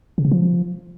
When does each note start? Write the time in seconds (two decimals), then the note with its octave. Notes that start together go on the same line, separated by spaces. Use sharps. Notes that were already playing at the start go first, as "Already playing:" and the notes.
0.18 C#3
0.25 C3
0.32 F3